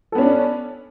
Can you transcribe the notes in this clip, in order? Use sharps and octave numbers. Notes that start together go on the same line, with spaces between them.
B3 C#4 D4 A4